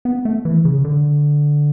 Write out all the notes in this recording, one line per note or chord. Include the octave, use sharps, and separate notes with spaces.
B3
A3
E3
C#3
D3